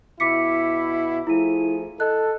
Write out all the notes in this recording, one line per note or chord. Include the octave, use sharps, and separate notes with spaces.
B2 E4 D6 B6 C#7
F3 A3 E4 G#4 D#7
A4 D#5 F#6